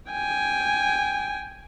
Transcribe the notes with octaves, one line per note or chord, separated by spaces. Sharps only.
G5 G#5